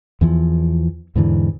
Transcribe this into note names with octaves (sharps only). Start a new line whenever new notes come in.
E2 E3 F3
E2 G#2 D3 E3